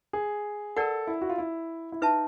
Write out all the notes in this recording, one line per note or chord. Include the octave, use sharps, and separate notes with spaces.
G#4
A4 A#4 D5 F#5
E4
F#4
F4
E4
E4
D#4 B4 E5 A5